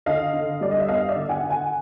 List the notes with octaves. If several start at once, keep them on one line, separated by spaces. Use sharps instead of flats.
D3 D#5 F5
D3
G3 D5
D#5
E5
B3 D#5 F5
D5 E5
D3
F#5 G#5
D3
F#5 G#5